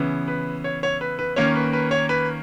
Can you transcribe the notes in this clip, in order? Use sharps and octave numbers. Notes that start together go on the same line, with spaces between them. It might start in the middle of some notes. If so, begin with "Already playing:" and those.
Already playing: C#3 E3 B3
B4
C#5
C#5
B4
B4
D#3 A#3 C#4 C#5
B4
B4
C#5
B4